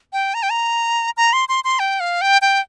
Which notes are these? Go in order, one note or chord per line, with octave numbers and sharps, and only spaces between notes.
G5
A#5
G5
A#5
A#5
C6
C6
C6
G5
F5
G5
G5